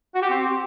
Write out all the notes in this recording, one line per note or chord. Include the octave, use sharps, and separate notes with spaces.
F#4
G4
C4